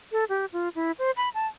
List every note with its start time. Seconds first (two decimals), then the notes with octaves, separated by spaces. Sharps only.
0.12 A4
0.29 G4
0.53 F4
0.75 E4
0.99 C5
1.17 B5
1.34 A5